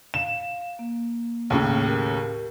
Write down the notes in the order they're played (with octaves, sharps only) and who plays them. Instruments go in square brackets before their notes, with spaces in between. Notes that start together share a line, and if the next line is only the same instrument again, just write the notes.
[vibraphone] F5 [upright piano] E7
[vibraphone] A#3
[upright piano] D#2 A2 C#3
[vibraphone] G4 A#4